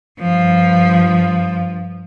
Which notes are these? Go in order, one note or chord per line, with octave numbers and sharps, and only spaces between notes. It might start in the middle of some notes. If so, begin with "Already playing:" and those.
G2 F3